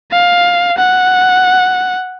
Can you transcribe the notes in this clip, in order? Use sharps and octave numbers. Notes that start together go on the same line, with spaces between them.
F5
F#5